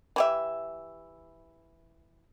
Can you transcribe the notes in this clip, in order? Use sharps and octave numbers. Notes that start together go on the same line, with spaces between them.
E3 G4 E5